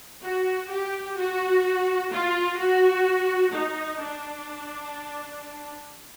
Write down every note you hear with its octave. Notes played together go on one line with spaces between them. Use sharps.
F#4
G4
F#4
F4
F#4
D#4
D4